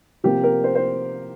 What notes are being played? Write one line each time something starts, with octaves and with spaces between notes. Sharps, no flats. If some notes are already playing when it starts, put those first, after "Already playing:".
C3 F3 A#3 G4
A#4
C5
C5